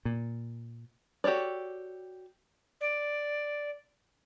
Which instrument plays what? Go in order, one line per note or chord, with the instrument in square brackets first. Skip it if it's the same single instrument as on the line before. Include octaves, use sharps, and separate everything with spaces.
[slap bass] A#2
[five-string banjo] F#4 G4 A4 C#5 D5
[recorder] D5